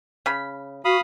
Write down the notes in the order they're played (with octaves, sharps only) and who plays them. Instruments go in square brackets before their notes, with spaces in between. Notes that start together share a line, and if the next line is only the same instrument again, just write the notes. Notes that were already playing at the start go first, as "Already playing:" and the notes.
[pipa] C#3 B5
[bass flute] F#4 [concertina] F5 B5 D#6